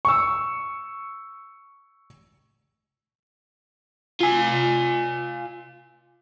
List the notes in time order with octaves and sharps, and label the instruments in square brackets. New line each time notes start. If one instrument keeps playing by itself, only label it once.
[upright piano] C#6 E6
[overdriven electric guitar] F4 G#5